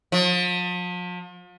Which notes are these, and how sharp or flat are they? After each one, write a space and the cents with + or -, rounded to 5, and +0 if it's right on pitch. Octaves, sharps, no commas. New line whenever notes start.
F3 +40